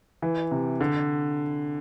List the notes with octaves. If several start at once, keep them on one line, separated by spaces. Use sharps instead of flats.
E3
C3
D3